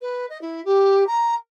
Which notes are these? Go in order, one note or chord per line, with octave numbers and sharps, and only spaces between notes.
B4
D#5
E4
G4
A#5